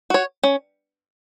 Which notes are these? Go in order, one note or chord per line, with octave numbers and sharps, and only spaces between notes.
F#4 C#5
C#4